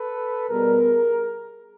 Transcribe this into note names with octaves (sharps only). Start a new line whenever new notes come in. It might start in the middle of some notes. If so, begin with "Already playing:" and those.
Already playing: A4 B4
B2 G3 B3 G#4 A#4